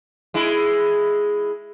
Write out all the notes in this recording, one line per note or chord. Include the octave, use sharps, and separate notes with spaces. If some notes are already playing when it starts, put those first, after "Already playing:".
G#3 E4